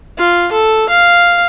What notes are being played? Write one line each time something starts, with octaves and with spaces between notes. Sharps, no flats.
F4
A4
F5